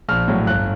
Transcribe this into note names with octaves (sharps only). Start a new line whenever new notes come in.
A#1 F6
A2 F#3
G1 F#6